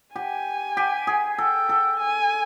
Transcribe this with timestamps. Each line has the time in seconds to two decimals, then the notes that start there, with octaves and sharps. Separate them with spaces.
0.15 G4 G#5
0.77 G4
1.07 G#4
1.38 A4 G5
1.69 A4
2.00 G#5